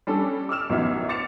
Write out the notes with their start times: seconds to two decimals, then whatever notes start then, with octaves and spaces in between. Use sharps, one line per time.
0.07 G3 C#4 D4 A4
0.49 D6 E6 F6 E7
0.69 A1 F#2 B2 D#4 B4 E5
1.09 D6 A6 C#7 E7 F7